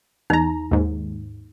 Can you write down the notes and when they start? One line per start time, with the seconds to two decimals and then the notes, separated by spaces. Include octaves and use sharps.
0.30 E2 D#4 A#5
0.71 D#2 G#2